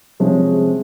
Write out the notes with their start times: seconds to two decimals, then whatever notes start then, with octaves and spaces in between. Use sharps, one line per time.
0.20 C3 F3 G#3 C#4